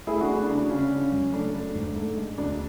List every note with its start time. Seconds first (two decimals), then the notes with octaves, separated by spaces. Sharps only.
0.07 A3 E4 G#4
0.21 D4 F#4
0.29 A3
0.35 D4
0.49 C#3 D4
0.70 C#3 C#4
0.91 C#3
1.12 F#2
1.33 A3 D4
1.54 A3
1.75 G#2
1.96 A3
2.17 G#3
2.38 D2 D4